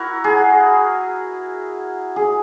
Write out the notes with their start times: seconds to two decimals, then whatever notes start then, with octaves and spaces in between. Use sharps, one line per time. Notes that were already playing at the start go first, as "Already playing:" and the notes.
Already playing: E4 F#4 A#4
0.24 G#4
2.16 G#4